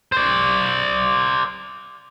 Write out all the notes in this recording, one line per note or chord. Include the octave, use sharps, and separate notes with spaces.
C5 D5